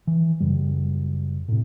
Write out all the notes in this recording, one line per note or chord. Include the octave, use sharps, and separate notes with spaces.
E3
F#1 F#2 C#3 G3
A2 C3